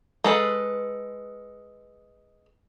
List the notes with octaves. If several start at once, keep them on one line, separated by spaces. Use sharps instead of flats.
G#3 A4 B4